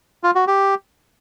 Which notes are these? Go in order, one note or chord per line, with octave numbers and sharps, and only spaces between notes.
F4
F#4
G4